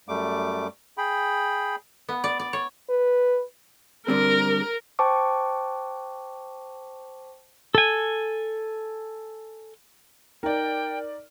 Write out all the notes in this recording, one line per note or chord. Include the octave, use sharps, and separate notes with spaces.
F#2 G3 A3 D6
G#4 G5 B5
B3
D5
D5
C#5
B4
D3 G3 C4 A#4
C5 G5 A5 C#6 D6
A4 G#5
D#4 A#4 D5 G5